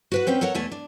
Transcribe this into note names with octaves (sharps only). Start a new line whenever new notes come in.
F#4 B4 F#5
C4 C#4 B4 G5
A4 A#4 C#5 F#5 A#5
E2 B2 A3 A4 G#5
D4